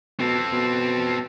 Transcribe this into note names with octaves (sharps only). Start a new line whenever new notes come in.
B2 C4 A4
B2